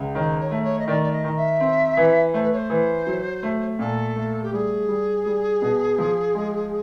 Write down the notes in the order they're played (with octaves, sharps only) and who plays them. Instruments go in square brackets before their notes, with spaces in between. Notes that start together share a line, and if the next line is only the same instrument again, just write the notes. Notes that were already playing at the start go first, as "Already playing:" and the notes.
Already playing: [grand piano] C#2
[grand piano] D#3 [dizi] C#5
[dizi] C5
C#5
[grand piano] A3
[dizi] C#5
D#5
[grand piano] D#3 [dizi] D5
[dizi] D5
D#5
[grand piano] D#3
[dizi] E5
[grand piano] C4
E3
[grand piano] A3 [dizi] C5
[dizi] B4
C#5
C5
[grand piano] E3
F#3
A3
[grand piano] A#2 [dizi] A4
[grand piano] A3
[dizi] G4
[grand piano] G3 [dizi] G#4
[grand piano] G3
G3
B2
F3
G#3